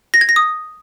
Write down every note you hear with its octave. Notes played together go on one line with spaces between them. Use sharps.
A#6
G#6
A#6
D#6